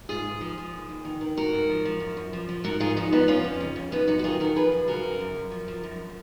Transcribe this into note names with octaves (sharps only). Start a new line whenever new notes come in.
G#2 F4 G#4
G#2
F3
F3
D#2
D#2
D#3
D#3
G#2 F#4 A#4
G#2
F3
F3
F#2
F#2
F3
F3
G#2 F#4 A#4
G#2 F4 G#4
F3 D#4 F#4
F3 B3 D#4
F3 C#4 F4
F2
C#3
F2
F#2 B3 D#4
F#2 D#4 F#4
F#4
D#3 F4 G#4
D#3 F#4 A#4
F3 G#4 B4
F#2
C#3 F#4 A#4
F#2
F#2
F#2
F3
F3
F#2